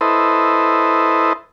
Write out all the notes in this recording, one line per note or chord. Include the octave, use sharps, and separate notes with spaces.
E4 A4 B4 C5 D#5